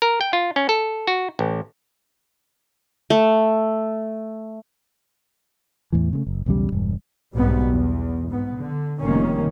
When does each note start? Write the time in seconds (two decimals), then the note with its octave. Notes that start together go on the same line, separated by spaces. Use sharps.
0.02 A#4
0.21 G5
0.33 F4
0.56 C#4
0.69 A4
1.07 F#4
1.39 A1
3.10 A3
5.92 E2 A2 E3
6.13 C#3 G#3 A3
6.27 F#1
6.46 B1 E2 C#3 G3
6.72 E1 G2
7.35 B1 G#2 B2 G3 B3
7.70 E2
8.28 G#2 B3
8.57 D3
9.01 F1 D#3 G3 A#3 C#4